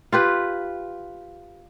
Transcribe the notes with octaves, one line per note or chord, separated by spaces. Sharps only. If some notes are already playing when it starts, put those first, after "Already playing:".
F4 G4 B4